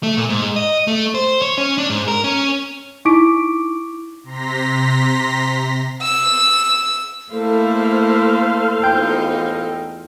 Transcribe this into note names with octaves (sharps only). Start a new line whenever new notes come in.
A3
A#2
G#2
D#5
A3
C5
C#5
C#4
D4
G#2
A#4
C#4
D#4 E4 C#6 D6 B6 D7
C3 A#5 C6 A#6 B6
E6
A3 A#3 E4 A4 C5 F5
E2 D#4 F4 G5 G6